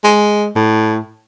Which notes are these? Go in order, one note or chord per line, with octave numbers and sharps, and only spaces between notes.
G#3
A2